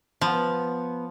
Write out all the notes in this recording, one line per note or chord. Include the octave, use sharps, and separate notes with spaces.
F3 B3